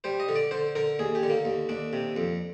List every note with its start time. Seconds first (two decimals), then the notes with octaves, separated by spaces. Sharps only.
0.04 G3 C5
0.20 D#5
0.29 D3
0.35 D5
0.51 D3 C5
0.75 D3 A#4
0.99 D#2 G#4
1.15 G4
1.23 D3
1.30 A#3
1.45 D#2
1.69 D#2 D4
1.93 C3
2.16 F2